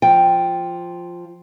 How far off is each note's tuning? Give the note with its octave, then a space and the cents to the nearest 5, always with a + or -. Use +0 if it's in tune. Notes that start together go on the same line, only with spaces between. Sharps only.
F3 +0 G5 +0